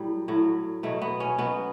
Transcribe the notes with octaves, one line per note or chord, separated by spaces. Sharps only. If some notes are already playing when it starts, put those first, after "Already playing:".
Already playing: A2 F#3 G3
A2 F#3
B2 F#3 A3
B3
C#4
B2 F#3 B3